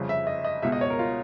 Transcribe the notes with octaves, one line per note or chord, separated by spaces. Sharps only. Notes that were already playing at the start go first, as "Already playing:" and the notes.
Already playing: G1 F2 C#3
E5
D#5
D#5
C#2 B2 E5
D#5
C#5
A#4
F4